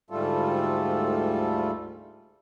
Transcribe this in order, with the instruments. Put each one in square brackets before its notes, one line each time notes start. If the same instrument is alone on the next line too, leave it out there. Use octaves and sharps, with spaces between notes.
[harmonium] D2 G#2 G3 A3 F4 A4